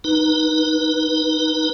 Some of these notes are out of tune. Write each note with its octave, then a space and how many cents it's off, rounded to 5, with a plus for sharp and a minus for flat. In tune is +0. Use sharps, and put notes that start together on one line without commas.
D#4 -5 B4 -10